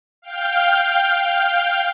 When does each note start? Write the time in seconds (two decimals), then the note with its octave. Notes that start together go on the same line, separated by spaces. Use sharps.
0.22 F5 G5 F6 G6